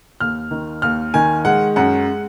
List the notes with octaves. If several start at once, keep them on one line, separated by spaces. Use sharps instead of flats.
D#2 F6
D#3
D#2 F6
D#3 G#5
G#3 F#5
F#2 F#5